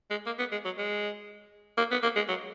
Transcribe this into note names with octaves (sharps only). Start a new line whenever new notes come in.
G#3
A#3
B3
G#3
F#3
G#3
A#3
B3
A#3
G#3
F#3